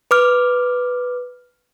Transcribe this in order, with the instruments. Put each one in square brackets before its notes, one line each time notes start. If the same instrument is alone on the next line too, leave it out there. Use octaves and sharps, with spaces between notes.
[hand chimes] B4 D6 F6